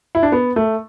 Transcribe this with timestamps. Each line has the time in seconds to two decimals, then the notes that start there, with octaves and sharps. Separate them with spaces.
0.15 E4
0.23 D4
0.32 B3
0.56 A3